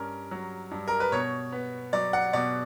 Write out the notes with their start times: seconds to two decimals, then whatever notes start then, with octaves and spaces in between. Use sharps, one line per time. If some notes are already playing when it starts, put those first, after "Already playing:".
Already playing: G2 C#4 A#4
0.31 F#3
0.71 G2
0.88 A#4
1.00 B4
1.12 B2 C#5
1.52 B3
1.93 F#3 D5
2.13 F#5
2.33 B2 D5